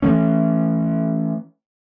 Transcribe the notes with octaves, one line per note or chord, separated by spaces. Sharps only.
E3 A3 C#4